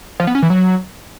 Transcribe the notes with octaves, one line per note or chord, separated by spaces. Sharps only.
F3
B3
C#4
E3
F#3